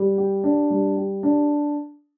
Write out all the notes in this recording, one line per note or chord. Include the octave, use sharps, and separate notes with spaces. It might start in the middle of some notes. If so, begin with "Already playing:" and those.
Already playing: G3
G4
D4
G3
G4
D4